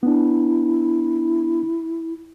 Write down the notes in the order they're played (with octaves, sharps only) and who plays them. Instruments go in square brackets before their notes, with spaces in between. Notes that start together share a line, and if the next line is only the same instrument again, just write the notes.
[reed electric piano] B3 D4 [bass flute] E4